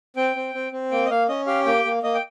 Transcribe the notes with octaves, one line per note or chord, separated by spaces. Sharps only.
C4 G5
C4
C4
C4
A#3 G5
D#5
A#3 F5
C#4 D#5
G4 F5
A#3 G5
A#3
A#3 D#5
G5